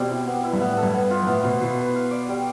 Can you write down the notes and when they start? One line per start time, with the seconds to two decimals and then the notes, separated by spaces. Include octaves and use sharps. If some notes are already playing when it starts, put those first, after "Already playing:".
Already playing: B2 G3 C4 G4
0.10 E4
0.27 B3
0.43 E4
0.53 G2
0.60 A2 B3
0.71 A2
0.77 A4
0.83 G2
0.94 B3
1.10 F4
1.23 G2
1.27 A2 B3
1.44 B2 C5
1.61 B2 E4
1.78 B4
1.95 F5
2.11 D5
2.29 G3